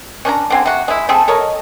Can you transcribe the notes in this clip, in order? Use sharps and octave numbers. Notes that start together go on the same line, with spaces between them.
C#4 D4 C#5 A#5
D3 C4 G#5
C3 F#4
G#3 E4
A3 C4 G#4 A4
A4 A#4 C#5 D#5